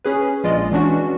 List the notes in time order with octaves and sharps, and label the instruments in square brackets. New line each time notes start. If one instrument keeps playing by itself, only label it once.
[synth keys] C#4 G#4 B4
A#1 G#3 F4 D5 D#5
E3 C#4 D4 F#4